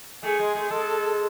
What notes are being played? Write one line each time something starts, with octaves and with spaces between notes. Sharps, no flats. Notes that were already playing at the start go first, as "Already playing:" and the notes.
A3 G#4
G#3
A3
G#3 A4